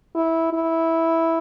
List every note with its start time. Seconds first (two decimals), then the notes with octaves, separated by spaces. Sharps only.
0.15 E4
0.53 E4